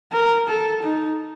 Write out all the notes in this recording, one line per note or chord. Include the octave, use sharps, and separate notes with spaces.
A#4
A4
D#4